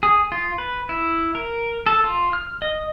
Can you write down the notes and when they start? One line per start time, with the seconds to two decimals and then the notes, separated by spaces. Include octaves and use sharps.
0.03 G#4
0.32 F4
0.58 B4
0.89 E4
1.35 A#4
1.86 A4
2.04 F4
2.33 F6
2.62 D#5